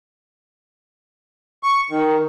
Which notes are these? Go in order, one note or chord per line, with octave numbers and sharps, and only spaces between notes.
C#6
D#3